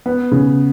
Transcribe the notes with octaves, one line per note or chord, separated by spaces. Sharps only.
B3
C#3